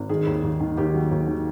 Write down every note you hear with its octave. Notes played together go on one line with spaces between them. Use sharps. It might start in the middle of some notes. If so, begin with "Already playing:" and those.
Already playing: G#1
D#3 G#4
D#2
D#2
D#3
D#2 G4
F#3
D#2
D#3